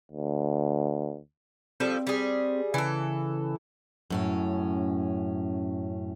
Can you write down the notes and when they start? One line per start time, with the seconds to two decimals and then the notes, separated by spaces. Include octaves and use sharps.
0.12 D2
1.80 F3 G3 C4 A4
2.07 G3 G#4
2.74 C#3 E3 A4
4.10 F#2 A2 C#4